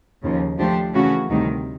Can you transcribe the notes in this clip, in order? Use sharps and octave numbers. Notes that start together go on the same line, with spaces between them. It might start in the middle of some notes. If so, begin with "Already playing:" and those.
D#2 C#3 F3
F3 A3 D4 G4 C5
C#3 E3 A3 C#4 F#4
D2 C3 D#3 G3